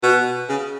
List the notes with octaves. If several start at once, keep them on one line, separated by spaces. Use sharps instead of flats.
B2
C#3